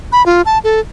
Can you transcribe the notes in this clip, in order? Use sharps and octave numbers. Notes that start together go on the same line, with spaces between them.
B5
F4
A5
A4